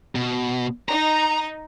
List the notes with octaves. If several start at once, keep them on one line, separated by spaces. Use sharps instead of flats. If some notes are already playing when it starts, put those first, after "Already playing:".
B2
D#4 A#5